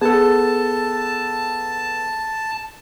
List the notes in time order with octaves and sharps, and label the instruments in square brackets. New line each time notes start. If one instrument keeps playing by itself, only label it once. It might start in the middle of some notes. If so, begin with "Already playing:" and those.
[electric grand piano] B3 A4 [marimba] G#4 [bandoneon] A5